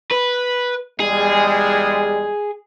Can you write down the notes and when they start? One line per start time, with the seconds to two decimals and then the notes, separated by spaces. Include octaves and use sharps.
0.11 B4
1.00 E2 G3 G#3 G#4